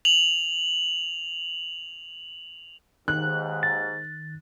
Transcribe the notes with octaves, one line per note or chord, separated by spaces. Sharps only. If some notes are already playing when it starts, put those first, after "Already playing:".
F7 F#7
D#2 G#2 D#3 F#6
A6